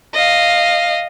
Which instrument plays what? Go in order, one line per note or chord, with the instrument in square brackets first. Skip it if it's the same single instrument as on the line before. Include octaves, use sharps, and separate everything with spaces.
[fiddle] D#5 F5